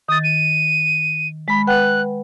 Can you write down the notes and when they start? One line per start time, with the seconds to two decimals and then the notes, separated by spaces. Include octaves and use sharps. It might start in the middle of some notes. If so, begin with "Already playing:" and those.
0.09 D#3 D#6 A6
0.24 D#7
1.48 G#3 B5 B6
1.67 B4 F#5 G5 F#6